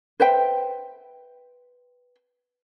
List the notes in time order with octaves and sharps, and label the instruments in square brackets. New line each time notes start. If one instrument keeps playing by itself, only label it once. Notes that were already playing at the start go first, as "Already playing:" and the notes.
[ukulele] B4 C5 E5 G5